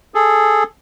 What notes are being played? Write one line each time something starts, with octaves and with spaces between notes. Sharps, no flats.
G#4 A4